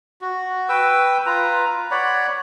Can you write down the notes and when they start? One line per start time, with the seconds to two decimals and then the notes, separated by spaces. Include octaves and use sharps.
0.21 F#4
0.69 B4 G5 E6
1.26 F4 B4 A#5
1.91 C#5 D5 F#5 B5